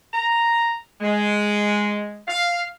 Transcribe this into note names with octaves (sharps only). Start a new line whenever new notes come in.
A#5
G#3
F5